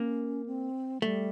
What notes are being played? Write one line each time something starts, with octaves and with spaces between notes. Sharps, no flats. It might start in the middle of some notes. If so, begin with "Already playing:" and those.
Already playing: A#3 C#4
C4
G3 A3